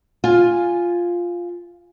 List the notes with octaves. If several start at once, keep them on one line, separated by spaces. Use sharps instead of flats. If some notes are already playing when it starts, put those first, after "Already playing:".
F4 G#5